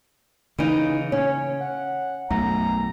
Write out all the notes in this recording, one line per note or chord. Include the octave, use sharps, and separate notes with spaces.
C#3 E3 D#4
C#4 C#5
F#5
B1 F#2 A3 A#5